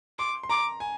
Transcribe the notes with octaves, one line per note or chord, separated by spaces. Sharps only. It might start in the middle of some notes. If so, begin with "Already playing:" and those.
C6 D6
C6
A#5 D6
G#5